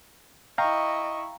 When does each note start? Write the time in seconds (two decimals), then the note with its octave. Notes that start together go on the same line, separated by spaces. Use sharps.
0.58 E4 D#5 F5 G5 A#5 C#6